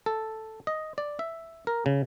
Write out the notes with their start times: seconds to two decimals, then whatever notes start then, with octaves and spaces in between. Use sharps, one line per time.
0.06 A4
0.67 D#5
0.98 D5
1.19 E5
1.67 A#4
1.86 C#3